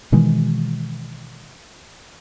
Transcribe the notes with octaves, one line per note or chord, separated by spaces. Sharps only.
B2 D#3 E3 G#3